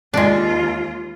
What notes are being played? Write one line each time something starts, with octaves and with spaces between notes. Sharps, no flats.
D#2 G#3 D4 F4